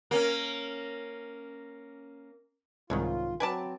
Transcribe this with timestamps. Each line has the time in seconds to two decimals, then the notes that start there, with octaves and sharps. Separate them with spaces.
0.11 A#3 C#4
2.90 C2 G#2 D#3 F4 C#5
3.40 F#3 C4 B4 D5 G#5 A5